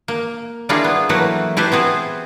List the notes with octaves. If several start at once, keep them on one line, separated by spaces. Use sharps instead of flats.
A#3
G3 A#3 D4 E4 F4 G#4
B3
E3 F#3 A3 A#3 B4
E4 G4 A4 B4 C5
B3 C4 G#4 B4